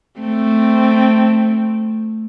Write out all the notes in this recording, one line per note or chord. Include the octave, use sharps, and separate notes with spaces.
A3 C4